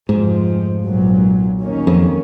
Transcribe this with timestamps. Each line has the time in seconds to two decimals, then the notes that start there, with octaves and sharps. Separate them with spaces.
0.09 F1 F2 G#2 F3
0.85 B1 A#2 F#3
1.61 D#2 D#3 A#3 C#4
1.87 F2